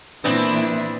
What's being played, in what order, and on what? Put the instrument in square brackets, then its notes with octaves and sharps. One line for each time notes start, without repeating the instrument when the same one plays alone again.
[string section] A#2 E3 E4 [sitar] B3 C4 D4